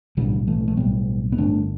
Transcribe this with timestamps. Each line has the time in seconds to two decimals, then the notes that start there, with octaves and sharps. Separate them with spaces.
0.17 B1 A2 D3 G3
0.47 E3 A3
0.68 A3
0.77 B1 A2 G3 B3
1.32 B3
1.37 G1 G2 D3 A3 D4